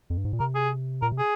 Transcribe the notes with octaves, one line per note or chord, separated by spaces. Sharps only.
F2
G2
G#2
A#2
C3 A#4
G#4
A#2 A#4
C3
G#4